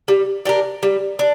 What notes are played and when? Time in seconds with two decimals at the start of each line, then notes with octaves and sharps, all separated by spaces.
0.08 G3
0.45 D4 G4 A#4
0.83 G3
1.19 D4